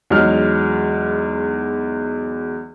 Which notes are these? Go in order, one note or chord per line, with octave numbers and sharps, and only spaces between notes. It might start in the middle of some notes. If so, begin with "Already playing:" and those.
E2 F#3 G#3 D#4 F6